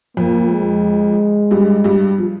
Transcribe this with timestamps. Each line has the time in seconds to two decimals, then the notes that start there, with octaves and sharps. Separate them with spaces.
0.17 F2 F3 A#3
0.50 G#3
1.51 G2 G3
1.84 G2 G3
2.18 F3